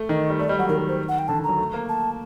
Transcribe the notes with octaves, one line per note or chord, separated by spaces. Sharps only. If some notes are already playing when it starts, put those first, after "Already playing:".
Already playing: A3
D#3 D#5
G3
A3 D5
G3 D#5
F#3 F#5
D#3 A#4
C5
F#5
G5
D3 A5
D#3
F#3 A#5
A3
A#3
A5